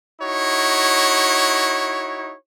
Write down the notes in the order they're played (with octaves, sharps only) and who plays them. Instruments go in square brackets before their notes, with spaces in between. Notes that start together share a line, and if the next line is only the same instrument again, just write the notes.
[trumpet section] D#4 E4 F#4 C#5